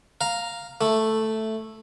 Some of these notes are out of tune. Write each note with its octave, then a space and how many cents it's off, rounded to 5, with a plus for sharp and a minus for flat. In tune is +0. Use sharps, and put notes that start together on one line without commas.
F5 +0 A#5 +0
A3 +0 E4 +0